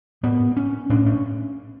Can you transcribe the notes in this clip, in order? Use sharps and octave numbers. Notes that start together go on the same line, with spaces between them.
A2 B3
C#4
A2 D4
C#4